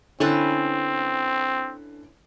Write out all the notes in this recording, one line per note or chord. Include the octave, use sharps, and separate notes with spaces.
D3 C4 C#4 E4 B4 A6